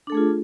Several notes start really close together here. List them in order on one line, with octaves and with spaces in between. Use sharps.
D4 A4 A3 G#4 F4